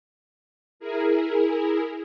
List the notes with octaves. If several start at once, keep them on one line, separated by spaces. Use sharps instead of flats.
E4 G#4 A#4